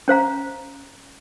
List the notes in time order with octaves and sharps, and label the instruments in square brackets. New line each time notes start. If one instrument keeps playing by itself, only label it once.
[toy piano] C#4 C5 F5 A#5